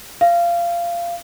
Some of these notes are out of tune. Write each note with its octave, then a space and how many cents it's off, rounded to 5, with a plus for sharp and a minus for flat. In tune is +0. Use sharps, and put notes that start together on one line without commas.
F5 -20